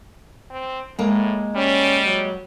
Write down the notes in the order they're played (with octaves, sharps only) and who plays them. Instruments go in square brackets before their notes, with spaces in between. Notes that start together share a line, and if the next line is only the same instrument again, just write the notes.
[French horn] C4
[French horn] A2 [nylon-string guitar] G#3 A#3
[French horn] G3 [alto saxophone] C#4
[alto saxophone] F#3